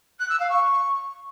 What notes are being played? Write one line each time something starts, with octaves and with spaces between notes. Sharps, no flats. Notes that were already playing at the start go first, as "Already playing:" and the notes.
F#6
E6
F5
C#6